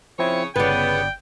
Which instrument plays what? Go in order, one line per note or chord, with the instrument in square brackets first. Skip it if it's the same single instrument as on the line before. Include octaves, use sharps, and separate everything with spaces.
[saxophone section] C#3 C#5 [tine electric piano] F3 C4 E4
[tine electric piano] G1 D5 [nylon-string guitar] C#3 B4 [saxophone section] B3 [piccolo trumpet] G5